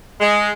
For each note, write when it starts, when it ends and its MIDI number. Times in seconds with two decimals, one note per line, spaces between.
0.21 0.51 56